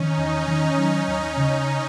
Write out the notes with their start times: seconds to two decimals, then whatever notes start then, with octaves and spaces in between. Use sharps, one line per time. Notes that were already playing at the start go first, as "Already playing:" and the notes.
Already playing: D#3 C#4 D#4
0.18 E2
0.33 C#4
0.48 D#3
0.78 F#3
1.08 D#2
1.37 C#3